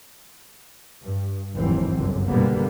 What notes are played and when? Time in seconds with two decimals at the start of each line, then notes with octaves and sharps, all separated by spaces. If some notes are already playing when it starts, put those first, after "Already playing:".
1.03 G2
1.56 F1 D#2 G#2 E3 F#3 C4
1.96 G1 C#2 F#2 D3
2.29 B2 D3 G3 A#3 B3